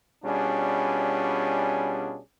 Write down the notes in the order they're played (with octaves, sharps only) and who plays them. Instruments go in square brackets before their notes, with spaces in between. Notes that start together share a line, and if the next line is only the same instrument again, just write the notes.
[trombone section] B2 G3 C#4 D4 F4 G#4